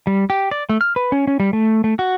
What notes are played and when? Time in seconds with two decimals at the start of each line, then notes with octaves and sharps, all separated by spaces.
0.07 G3
0.30 G4
0.51 D5
0.69 A3
0.81 F6
0.96 B4
1.12 C#4
1.27 C#4
1.40 G3
1.53 A3
1.84 A3
1.99 F#4